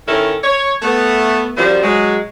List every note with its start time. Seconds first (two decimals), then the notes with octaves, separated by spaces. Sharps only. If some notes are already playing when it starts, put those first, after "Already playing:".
0.07 D#3 C#4 E4 A4 A#4
0.43 C#5
0.82 A3 B3
1.57 F#2 F3 G3 C5
1.83 F#3 G#3